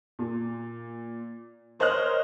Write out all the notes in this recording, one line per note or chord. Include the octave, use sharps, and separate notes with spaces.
A#2
A#4 C5 C#5 D#5 F6 F#6